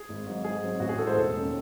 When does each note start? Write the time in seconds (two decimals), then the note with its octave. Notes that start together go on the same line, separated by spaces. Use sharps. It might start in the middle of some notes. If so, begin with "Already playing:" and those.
Already playing: G#4
0.09 G#1
0.26 G#2 F#3
0.44 G#2 G#4
0.63 F#3 C4
0.80 A1 F#4
0.89 G#4
0.98 G#2 E3 A4
1.07 C5
1.16 E1 A4
1.34 D#2 D#3 G#3 C#4